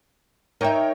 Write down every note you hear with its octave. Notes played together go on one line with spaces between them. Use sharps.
D#4 A#4 C#5 E5 G5